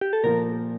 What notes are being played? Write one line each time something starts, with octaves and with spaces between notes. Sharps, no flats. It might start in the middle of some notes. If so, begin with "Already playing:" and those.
G4
A4
A#2 F3 A#3 A#4